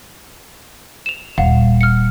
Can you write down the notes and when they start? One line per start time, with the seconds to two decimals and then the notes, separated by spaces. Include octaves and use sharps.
1.06 E7 F7
1.38 D#1 F5 F#5
1.81 F6 C#7